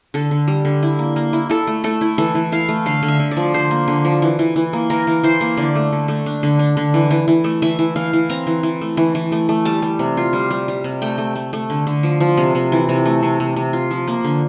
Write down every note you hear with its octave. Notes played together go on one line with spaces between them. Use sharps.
D3 A4
D3
G3
D3
E4
A#3
A#3
E4
E4 A4
A3
A3 A4
E4
E3 A4
E3
E4 F5
A3
D3 F5
D3
E5
D3
D5
F3
D3 C5
A#3
D3
F3
E3
E3
E3
A#3
E3 A#4
E3
E3 C5
A#3
D3 D5
A3
D3
A3
D4
D3
D4
D3
E3
E3
E3
A3
E3 E5
E3
E3 F5
E3
C4 A#5
E3
E3
A3
E3
E3
A3
A3
G3 A5
G3
C3
F4
G3
G3
G3
C3
A3 G5
A3
A3
A3
D3
D3
F3
F3
C3
C3
E3
C3
A3
C3
C3
C3
F4
F3
A#3
D3